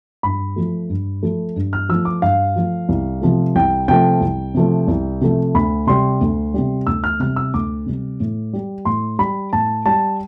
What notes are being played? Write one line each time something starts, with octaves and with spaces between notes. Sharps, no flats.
G2 B5
F3 A3
G2
F3 A3
G2
F6
F3 A3 E6
D6
G2 F5
F3 A3
C2
C3 F3 A3
C2 G5
C3 F3 A3 G5
C2
C3 F3 A3
C2
C3 F3 A3
D2 B5
C3 G3 C6
D2
C3 G3
D2 E6
F6
C3 G3 F6
E6
D2 D6
C3 G3
A2
G3
A2 C6
G3 B5
A2 A5
G3 A5